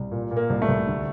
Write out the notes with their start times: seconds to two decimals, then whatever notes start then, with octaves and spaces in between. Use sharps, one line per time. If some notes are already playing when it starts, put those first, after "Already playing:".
Already playing: C2
0.11 A#2
0.31 A#2
0.37 A#3
0.50 C2
0.62 A3
0.69 C2
0.87 D2